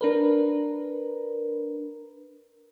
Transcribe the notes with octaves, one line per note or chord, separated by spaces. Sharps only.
D4 A#4 B4